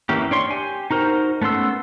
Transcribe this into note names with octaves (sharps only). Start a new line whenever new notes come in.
E3 A#3 C#4 G4
D4 C#5 C6
G4 G#5
D#4 F#4 A#4 C5
A3 B3 C#4 C6 E6